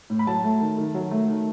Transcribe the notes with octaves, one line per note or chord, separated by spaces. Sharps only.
A2
B5
F#3 A5
A3
D#3
D#3
F#3
A3
D#3